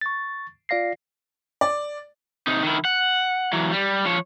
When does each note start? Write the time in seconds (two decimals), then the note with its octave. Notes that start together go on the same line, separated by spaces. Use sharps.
0.01 C#6 A6
0.69 F4 D5 F5 A#6 C7
1.61 D5
2.47 C3 D#4
2.63 D#3 E4
2.85 F#5
3.53 E3 F#3
3.72 G3
4.05 F3 C#5